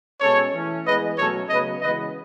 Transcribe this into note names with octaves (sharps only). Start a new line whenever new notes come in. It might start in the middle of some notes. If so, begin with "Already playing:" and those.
B2 G#3 C#4 A4 C#5
E3 A3 C#4
E3 G#3 B3 B4 D#5
B2 F#3 A3 C#4 A4 C#5
C#3 F#3 B3 B4 D#5
C#3 E3 G#3 B3 B4 D#5